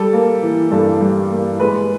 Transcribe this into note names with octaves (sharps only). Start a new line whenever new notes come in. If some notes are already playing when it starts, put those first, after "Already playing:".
Already playing: G3 A4
A#3
E3
G2 A4
G3
A#3
G#3 B4